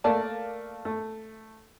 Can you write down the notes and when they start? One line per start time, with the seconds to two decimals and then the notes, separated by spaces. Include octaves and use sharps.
0.04 A3 A#3 D5 A5
0.85 A3